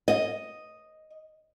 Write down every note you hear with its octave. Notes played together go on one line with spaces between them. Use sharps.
D#5